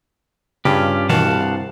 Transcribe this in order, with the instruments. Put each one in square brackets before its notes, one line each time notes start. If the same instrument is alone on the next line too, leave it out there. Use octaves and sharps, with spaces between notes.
[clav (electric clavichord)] G2 [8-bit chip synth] C#3 [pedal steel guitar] C#4 F4 G4
[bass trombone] C2 [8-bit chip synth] B2 D#3 E3 [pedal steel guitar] F5 F#5 A5